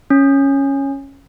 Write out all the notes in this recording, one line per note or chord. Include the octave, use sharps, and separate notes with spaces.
C#4